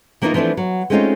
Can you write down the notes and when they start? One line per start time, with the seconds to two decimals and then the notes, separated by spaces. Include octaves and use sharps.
0.22 E3 A#3 B3 C#4 D#4 F4
0.34 E3 F3 A3 C4 D4 E4
0.57 F#3
0.90 G#3 A3 C4 C#4 D#4 F4